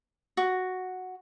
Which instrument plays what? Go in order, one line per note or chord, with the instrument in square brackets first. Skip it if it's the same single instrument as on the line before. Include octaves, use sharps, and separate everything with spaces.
[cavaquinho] F#4